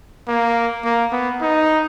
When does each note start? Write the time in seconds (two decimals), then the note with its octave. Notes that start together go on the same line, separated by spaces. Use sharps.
0.27 A#3
0.84 A#3
1.12 B3
1.41 D#4